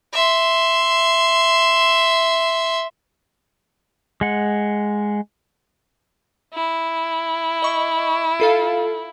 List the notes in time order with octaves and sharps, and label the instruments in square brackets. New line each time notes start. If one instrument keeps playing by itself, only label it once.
[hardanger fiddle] E5 C6
[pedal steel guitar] G#3 F#5
[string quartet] E4
[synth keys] D#5 C#6
F4 A4 F5